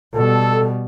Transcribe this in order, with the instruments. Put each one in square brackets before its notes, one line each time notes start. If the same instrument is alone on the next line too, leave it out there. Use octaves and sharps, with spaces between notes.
[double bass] B2 G3 [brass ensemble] A4